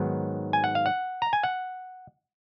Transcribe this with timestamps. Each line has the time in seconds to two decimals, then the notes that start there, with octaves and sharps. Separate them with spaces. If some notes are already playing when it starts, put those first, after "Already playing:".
Already playing: G#2 D#3 F#3 B3
0.53 G#5
0.64 F#5
0.75 F5
0.86 F#5
1.22 A#5
1.33 G#5
1.43 F#5